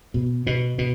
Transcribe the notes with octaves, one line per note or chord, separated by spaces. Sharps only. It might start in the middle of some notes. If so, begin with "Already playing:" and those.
B2
B2
B2